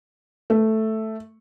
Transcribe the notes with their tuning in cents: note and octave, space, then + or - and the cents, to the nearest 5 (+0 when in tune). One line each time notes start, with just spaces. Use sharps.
A3 +0